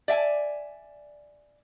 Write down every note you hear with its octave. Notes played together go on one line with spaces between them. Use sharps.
D5 E5 G5 G#5